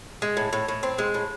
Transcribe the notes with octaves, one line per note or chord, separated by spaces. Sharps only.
G#3
A2
A2
A2
C4
G#3
A2